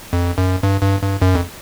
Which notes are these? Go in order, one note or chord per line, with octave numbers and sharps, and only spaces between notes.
F2
F#2
G2
G2
G2
F#2
F2